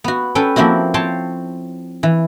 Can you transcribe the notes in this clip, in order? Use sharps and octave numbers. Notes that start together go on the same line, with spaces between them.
B3 F#4
C#4 A4 B4 G5
F3 A#3 C4 E4 F#4
C4 C#5 G5 A5 C6
E3